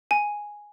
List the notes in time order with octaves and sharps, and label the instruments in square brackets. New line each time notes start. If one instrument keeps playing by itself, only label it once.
[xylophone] G#5